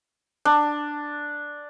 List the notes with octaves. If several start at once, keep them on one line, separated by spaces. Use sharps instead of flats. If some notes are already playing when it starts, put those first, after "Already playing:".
D4